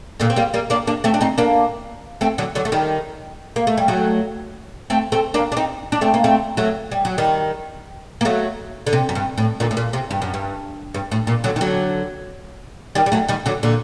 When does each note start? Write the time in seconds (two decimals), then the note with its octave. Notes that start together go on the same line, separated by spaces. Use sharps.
0.20 A#2 D3
0.30 C4
0.36 G3 A#3
0.54 G3 A#3
0.70 A#3 D4
0.87 A#3 D4
1.04 A3 C4
1.14 D4
1.21 C4 D#4
1.38 A#3 D4
2.21 A3 C4
2.38 D3 F#3
2.55 D3 F#3
2.65 A3
2.72 D#3 G3
3.56 A#3
3.67 A3
3.77 G3
3.88 F#3 A3
4.90 A3 C4
5.12 A3 C4
5.34 A#3 D4
5.52 D4
5.57 C4 D#4
5.92 D4
6.01 A3 C4
6.14 A#3
6.24 A3 C4
6.57 F#3 A3
6.92 G3
7.05 F#3
7.18 D#3 G3
8.21 A#3
8.25 F#3 A3
8.87 D3
8.93 C3
9.09 F#2
9.15 G2
9.38 A2
9.60 A#2 D3
9.71 A2
9.77 A#2
9.93 C3
10.11 G2
10.22 F#2
10.34 G2
10.94 G2
11.12 A2
11.27 A#2
11.44 D3 F#3
11.56 D#3
11.61 D3 F#3
12.95 D#3 G3
13.06 G3
13.12 F#3 A3
13.28 D#3 G3
13.46 D3 F#3
13.63 A#2 D3